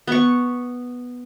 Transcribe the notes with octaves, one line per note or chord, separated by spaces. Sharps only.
B3 C#6